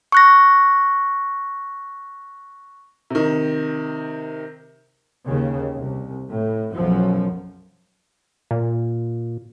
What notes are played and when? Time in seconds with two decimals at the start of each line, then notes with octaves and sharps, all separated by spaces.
0.12 C#6 F#6 A#6
3.10 C3 D#3
5.27 D#2 C#3
5.76 C2
6.30 A2
6.74 B1 F#2 F3
8.51 A#2